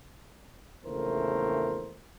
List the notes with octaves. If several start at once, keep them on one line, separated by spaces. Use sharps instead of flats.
A#1 E2 C#3 A3 A#4 C5